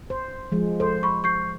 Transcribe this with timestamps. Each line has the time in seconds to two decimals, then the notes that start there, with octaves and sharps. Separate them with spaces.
0.10 C5
0.52 F3 G#3
0.80 A4 C5
1.03 B5 C#6
1.24 C#6 G6 C7